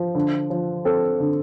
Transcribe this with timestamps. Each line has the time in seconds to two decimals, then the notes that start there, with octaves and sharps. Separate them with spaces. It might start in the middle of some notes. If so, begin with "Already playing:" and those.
Already playing: F3
0.15 D3
0.50 F3
0.85 C4 A4
1.20 D3